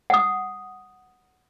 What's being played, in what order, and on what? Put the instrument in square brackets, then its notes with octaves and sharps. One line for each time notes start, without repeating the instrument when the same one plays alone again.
[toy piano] F#5 D#6